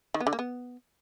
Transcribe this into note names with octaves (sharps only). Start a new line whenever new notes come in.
D#3
B3
D3
A#3
B3